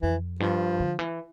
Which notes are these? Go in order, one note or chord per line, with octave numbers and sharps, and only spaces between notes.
F2 E3
G2 F3
D3
E3